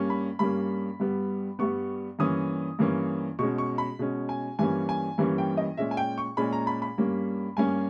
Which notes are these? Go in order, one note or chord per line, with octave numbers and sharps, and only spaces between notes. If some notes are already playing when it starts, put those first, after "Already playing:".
Already playing: G2 G3 A#3 C#4
B5
G2 G3 A#3 C#4 B5
G2 G3 B3
G2 G3 B3 C#6
G2 E3 A#3 C#4 D#6
G2 E3 A#3 C#4
B2 G#3 C#4 C#6
C#6
B5
B2 G#3 C#4
G#5
G2 E3 G3 A#3 C#4 G#5
G#5
G2 E3 G3 A#3 C#4
G5
D#5
A#2 G#3 C#4 E5
G#5
G5
C#6
A#2 G#3 C#4 B5
A#5
B5
B5
G2 G3 A#3 C#4
G2 G3 A#3 C#4 G#5